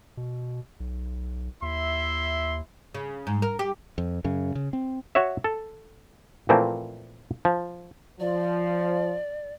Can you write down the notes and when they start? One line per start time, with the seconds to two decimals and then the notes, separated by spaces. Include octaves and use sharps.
0.17 B2
0.80 B1
1.62 D#2 E4 E5 C6
2.94 C#3
3.27 G#2
3.42 A#4
3.59 G4
3.98 F2
4.25 F#2 C#3
4.55 C#3
4.73 C4
5.15 F#4 C#5 E5
5.44 A4
6.49 A#2 E3 F3 A3 A#3 C4
7.45 F3
8.20 F3 D5